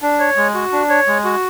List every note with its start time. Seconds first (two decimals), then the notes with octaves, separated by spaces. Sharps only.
0.02 D4
0.19 C#5
0.37 G#3
0.54 F#4
0.72 D4
0.90 C#5
1.07 G#3
1.24 F#4